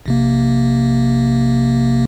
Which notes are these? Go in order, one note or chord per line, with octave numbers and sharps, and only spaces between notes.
A#1 C3 A#3